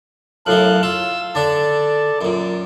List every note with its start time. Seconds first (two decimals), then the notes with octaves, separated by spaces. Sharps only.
0.47 F#2 A2 F#3 A4 F5 F#6
0.83 F4 E6
1.35 D3 D4 A4 D5 A5
2.21 F#2 A#2